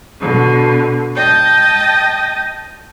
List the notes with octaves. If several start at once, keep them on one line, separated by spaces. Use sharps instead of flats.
B2 D3
D#5 G5 A5 D#6